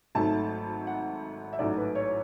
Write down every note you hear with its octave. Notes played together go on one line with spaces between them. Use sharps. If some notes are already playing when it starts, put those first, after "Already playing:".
G#1 G#2 F#3 A3 A5
F#5
E5
A1 G#2 F#3 A3 D5
B4
C#5